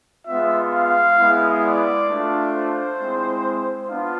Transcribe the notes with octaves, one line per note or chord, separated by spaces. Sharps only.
G#3 B3 F4 E5
F5
G#3 B3 E4
D5
A3 D4 F4
C5
G#3 C4 E4
B3 D4 F4